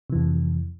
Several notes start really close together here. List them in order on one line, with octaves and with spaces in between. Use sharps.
C3 E3 F2